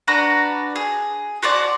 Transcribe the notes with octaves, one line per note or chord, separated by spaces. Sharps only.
D4 F#4 B4 A#5
G#4
F#4 C5 D5 A5